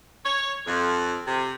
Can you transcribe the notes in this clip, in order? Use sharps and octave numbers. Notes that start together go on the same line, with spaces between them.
C#5
F2
C3